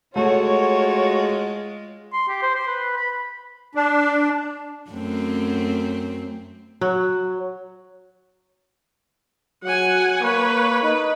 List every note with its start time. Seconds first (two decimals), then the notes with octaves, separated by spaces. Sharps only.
0.16 G#3 A3 F4 F#4 C#5
2.13 C6
2.29 G4
2.42 C5
2.56 C6
2.67 B4
2.97 B5
3.75 D4
4.90 F#2 A3 C4
6.81 F#3
9.64 F#3 F#5 G#5
10.22 A#3 B4 C#5
10.83 D#4 B4